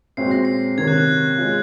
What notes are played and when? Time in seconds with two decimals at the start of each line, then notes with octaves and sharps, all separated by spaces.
0.17 A#2 G#3 C4 F#4 C#5 C7
0.31 A#6
0.45 C7
0.77 C3 D#3 A#3 C#4 G#6
0.88 F#6
0.98 F#6
1.08 F#6
1.38 G#3 C#4 F4